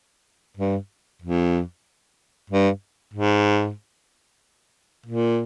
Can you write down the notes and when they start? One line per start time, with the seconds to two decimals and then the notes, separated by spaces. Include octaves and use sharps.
0.57 G2
1.22 F2
2.50 G2
3.14 G#2
5.06 A#2